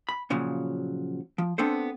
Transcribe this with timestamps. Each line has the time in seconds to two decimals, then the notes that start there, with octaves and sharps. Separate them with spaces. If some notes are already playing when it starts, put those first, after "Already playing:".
0.09 B5
0.30 A#2 C#3 F3 F#3
1.38 F3
1.58 B3 C4 D4 A4 C5